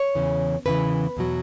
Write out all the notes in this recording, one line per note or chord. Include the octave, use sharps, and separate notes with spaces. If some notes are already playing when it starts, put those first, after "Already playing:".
Already playing: C#5
E2 C#3 E3
E2 C#3 E3 B4
E2 B2 F#3